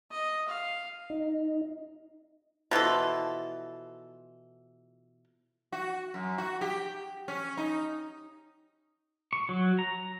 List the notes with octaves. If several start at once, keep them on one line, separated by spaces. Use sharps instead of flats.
D#5
F5
D#4
B2 E3 F3 A4
F#4
F#2
F#4
G4
C#4
D#4
C#6
F#3
A#5